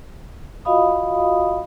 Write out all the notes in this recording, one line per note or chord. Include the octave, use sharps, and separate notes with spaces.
F4 F#4 D#5 F5 B5 D#6